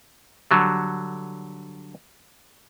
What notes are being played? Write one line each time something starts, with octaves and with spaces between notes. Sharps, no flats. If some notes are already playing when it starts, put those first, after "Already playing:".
D3 F#3 G3